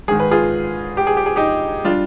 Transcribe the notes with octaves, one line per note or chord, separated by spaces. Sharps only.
G#2 D#3 G#3 G#4
B4
F4 G#4
G4
G#4
G4
G#4
D#4 G4
G3 D4 F4